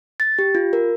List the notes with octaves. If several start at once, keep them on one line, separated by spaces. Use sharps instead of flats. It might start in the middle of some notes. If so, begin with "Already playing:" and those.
A6
G4
F4
A#4